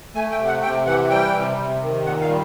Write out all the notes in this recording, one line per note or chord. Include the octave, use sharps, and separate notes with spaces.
A3 G#5
G5
C3
F#5
C3 G5
E3 F#5
G3 G5
C3
C3
D#3
A#2 F#5
F5
G3